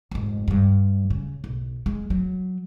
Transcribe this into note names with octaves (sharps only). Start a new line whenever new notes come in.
F1 G#2
G2 G3
C#3
B1
G#3
F#3